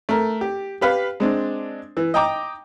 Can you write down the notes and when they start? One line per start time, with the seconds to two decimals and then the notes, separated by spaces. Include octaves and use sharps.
0.09 A3 A#4
0.41 G4
0.81 G4 B4 F5
1.20 G#3 C4 D4
1.97 E3
2.14 D#5 G5 A#5 D6